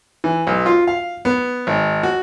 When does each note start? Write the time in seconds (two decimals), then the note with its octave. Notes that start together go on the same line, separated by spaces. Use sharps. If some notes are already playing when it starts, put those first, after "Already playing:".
0.24 E3
0.47 B1
0.66 F4
0.87 F5
1.25 B3
1.67 G#1
2.03 F#4